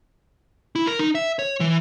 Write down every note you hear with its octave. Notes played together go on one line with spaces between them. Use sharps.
E4
A#4
D#4
E5
C#5
E3